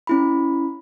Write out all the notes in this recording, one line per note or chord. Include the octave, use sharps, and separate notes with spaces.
C#4 E4 B5